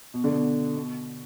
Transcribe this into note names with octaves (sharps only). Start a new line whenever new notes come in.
B2
D3
B2
B2